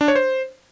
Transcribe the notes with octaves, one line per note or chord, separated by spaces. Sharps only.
D4
C#5
C5